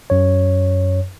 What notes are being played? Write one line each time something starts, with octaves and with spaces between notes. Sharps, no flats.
F#2 C#5